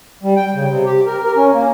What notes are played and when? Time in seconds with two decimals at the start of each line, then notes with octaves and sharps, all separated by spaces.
0.23 G3
0.36 G5
0.54 C#3
0.68 C3
0.86 G4
1.07 A#4
1.23 A#4
1.36 C#4
1.54 A#3